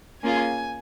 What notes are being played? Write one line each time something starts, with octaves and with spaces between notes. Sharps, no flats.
A#3 C#4 F4 G#4 G#5